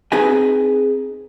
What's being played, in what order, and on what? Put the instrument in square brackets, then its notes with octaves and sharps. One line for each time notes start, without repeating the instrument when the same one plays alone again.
[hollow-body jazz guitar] C4 D#4 G#4 B4 D#5 G#5